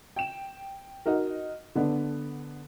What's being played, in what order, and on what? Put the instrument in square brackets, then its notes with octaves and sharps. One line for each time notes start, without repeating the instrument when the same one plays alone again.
[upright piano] G5 E7
D#4 F#4 A#4
D3 B3 D4